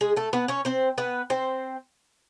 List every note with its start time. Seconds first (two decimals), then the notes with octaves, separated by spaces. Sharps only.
0.01 G#3 G#4
0.16 A3 A4
0.33 B3 B4
0.48 C#4 C#5
0.65 C4 C5
0.98 B3 B4
1.30 C4 C5